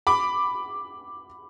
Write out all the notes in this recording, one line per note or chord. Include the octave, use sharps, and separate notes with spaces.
B5 D6